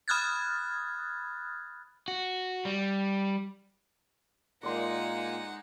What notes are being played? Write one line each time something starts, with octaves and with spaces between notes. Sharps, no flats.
B5 D#6 F6 F#6 G#6 A6
F#4
G3
A#2 G#3 A#3 D#4 D5 F#5 C6